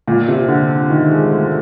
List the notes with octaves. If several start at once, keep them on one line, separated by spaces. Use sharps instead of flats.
A#2
C3
D3
D#3
G#3
A3